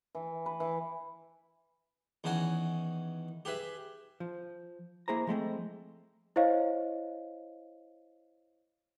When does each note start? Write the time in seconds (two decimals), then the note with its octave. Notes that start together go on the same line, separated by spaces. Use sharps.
0.15 E3
0.46 B4
0.60 E3
2.24 E2 D#3 C#4 F#4 G#5
3.45 G4 G#4 B4 E5
4.20 F3
5.08 A#3 E4 G#4 C5 A#5
5.27 F3 G#3 A3 C4
6.36 E4 C5 C#5 D#5 F5